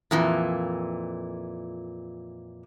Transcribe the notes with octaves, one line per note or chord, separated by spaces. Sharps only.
F2 A#2 E3